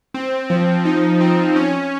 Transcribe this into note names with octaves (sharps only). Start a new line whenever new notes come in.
C4
F3
D#4
C4
C#4